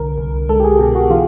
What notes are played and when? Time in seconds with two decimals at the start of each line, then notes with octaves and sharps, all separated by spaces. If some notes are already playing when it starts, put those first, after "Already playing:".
Already playing: C2 D3 A#4
0.18 C2
0.49 G#3 A4
0.60 G4
0.64 G#4
0.79 B2 G4
0.95 F#4
1.10 E3 F4